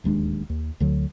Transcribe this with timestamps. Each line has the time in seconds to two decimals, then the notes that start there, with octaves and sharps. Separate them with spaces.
0.04 D1 D#2 G#3 D4
0.50 D#2
0.80 D2 D3 F#3